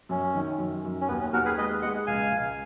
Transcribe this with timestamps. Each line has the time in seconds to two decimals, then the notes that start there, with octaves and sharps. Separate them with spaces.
0.09 F#2 C#4
0.35 D#3
0.59 F#2
0.84 F#2
1.01 C#4
1.08 D#2 B3
1.21 C#4
1.33 D#2 F#4 A#4
1.45 G#4 B4
1.58 G#3 B4 D#5
1.82 G#3 D#5 F#5
2.07 C#2 F5 G#5
2.32 C#2